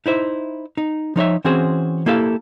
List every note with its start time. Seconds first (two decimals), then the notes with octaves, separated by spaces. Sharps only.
0.06 D#4 E4 C5 E5
0.77 D#4
1.16 F3 D#4 C#5 E5
1.45 E3 C4 C#4 F#4 G#4 C5
2.06 A#3 E4 G4 A4 F5